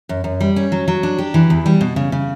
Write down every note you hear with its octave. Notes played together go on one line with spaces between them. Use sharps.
F#2
F#2
G3
C#4
F#3
F#3
D4
G4
E3
E2
G3
B2
C#3
C#3